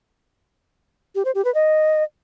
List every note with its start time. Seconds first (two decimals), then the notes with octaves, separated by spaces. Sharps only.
1.15 G4
1.25 C5
1.35 G4
1.45 B4
1.54 D#5